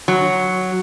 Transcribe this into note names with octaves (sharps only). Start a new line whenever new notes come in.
F#3